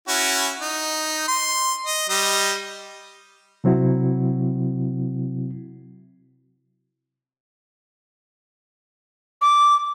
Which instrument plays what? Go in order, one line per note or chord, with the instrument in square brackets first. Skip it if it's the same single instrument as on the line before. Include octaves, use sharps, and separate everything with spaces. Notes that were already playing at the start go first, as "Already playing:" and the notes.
[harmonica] C#4 E4 F#4
D#4
C6
D#5
G3 D#5
[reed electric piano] C3 F#3 C4 E4 F#4
[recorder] D6